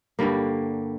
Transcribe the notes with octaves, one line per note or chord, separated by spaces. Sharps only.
G2 D3 G3 A#3